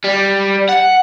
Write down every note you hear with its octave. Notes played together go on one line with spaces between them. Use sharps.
G3
F#5